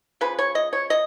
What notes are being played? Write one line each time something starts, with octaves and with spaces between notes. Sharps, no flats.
C#3 F3 B4
C#5
D#5
C#5
D#5